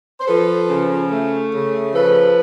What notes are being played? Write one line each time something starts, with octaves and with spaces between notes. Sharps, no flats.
C5
F3 A4 B4
C#3
A3
C#3
F3 A4 B4